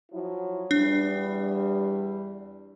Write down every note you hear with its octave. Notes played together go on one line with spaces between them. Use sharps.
F3 F#3 E4
E2 G3 D4